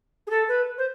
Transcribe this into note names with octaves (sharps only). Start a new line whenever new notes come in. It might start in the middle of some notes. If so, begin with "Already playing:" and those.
G#4
A4
B4
C5